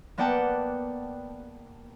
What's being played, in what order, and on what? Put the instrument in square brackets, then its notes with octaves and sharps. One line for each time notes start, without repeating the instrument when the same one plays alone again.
[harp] A#3 B3 D5 F#5 G5 A5